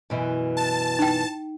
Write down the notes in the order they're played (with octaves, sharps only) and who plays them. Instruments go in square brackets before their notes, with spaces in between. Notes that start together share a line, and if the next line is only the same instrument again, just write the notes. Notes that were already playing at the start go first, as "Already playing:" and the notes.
[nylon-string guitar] F#2 B2 E3
[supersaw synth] A5
[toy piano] D#4 G5